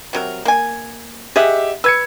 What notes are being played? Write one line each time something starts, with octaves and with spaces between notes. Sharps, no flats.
C3 F#3 A#4
A#3 G#5
G4 G#4 D#5 E5 F#5
B4 E6 G#6 C#7